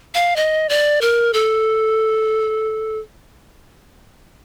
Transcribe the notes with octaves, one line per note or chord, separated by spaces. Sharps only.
F5
D#5
D5
A#4
A4